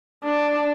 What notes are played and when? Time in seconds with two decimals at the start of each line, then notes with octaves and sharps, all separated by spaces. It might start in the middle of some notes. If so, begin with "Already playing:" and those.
0.24 D4